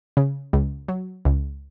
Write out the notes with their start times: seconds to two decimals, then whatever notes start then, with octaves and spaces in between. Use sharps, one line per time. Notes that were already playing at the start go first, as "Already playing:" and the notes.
0.17 C#3
0.53 C#2
0.88 F#3
1.25 C#2